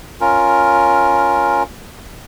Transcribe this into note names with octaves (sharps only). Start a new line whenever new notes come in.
C#4 F4 A#4